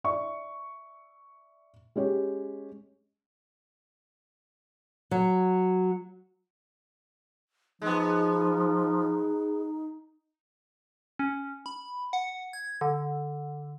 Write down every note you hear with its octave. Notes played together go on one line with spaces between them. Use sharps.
D5 E5 C#6
G#3 C#4 G4 C#5
F#3
F3 G#3 B3 D#4
C#4
B5
F#5
G#6
D3